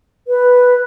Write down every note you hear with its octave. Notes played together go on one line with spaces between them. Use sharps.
B4